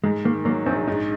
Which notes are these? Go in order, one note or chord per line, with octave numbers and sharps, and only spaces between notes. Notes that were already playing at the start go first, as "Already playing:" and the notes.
G#2 G#3
D#3 A#3
F#3 A#3
A#1 C4
G#2 D#4